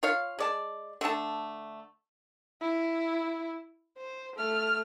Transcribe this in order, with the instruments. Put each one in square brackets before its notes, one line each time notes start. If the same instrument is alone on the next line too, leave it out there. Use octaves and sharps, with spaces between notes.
[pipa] F4 C#5 F5
G#3 D5 A5
D3 A3 A4 A5
[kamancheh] E4
C5
A3 F6